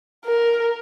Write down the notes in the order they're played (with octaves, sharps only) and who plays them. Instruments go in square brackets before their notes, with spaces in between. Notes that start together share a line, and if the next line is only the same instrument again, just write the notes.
[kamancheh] A#4